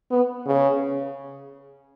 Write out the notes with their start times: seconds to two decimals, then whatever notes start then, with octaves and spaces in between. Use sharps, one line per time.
0.11 B3
0.47 C#3